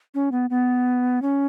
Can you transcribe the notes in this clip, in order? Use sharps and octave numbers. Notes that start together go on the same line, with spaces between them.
C#4
B3
B3
C#4